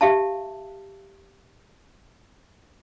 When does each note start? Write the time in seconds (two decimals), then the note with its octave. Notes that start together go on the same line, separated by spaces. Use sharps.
0.01 G4 E5 F5 A5